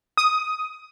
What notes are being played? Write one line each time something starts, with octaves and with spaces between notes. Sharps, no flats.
D#6